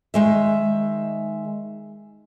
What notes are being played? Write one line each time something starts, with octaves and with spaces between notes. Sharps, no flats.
D#3 G#3 E5